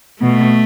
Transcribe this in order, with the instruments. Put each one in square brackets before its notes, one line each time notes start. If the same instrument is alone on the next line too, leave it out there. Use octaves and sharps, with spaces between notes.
[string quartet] B2 [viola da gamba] A3